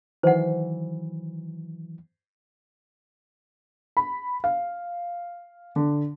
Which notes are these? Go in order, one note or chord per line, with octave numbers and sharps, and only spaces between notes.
D#3 E3 F#3 C5 F#5
B5
F5
D3